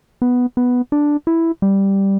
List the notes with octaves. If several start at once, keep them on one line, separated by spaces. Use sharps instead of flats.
B3
B3
D4
E4
G3